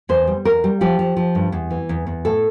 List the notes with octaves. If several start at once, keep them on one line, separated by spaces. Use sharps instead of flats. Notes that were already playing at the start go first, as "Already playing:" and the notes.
E2 C5
G3
E2 A#4
G3
F3 G4
F3
F3
G2
E2
E3
E2
E2
A2 A4